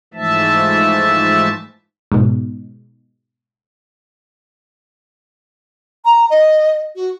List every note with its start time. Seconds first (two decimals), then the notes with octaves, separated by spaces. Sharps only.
0.14 G#2 E3 F3 A3 E5 A5
2.12 G#2 B2
6.05 A#5
6.30 D#5
6.96 F#4